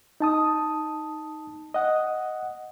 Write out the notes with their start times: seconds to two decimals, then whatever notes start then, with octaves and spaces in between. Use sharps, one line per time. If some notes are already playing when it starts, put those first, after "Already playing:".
0.20 D#4 A5 D#6
1.74 D#5 F#5